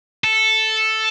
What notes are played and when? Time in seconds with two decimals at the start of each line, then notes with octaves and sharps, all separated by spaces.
0.24 A4